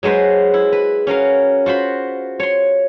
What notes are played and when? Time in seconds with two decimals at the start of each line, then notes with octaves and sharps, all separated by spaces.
0.03 F#3 G#3 F#4 B4 C5
0.54 E4
0.72 B4
1.07 C#4 F#4 A#4 F5
1.66 F4 F#4 C5 B5
2.39 C#5 C6